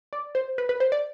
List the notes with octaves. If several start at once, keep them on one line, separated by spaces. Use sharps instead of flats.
D5
C5
B4
B4
C5
D5